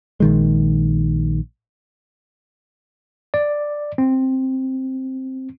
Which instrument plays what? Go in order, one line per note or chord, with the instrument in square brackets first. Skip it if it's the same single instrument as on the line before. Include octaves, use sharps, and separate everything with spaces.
[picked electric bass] A#1 D#3 G#3
[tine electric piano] D5
C4